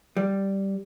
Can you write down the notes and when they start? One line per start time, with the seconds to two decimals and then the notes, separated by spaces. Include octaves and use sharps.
0.17 G3